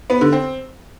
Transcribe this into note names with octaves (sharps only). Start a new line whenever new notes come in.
B3
D3
C4